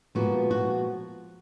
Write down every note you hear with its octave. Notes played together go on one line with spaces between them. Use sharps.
A#2 F3 G#3 B3 F#4
F#4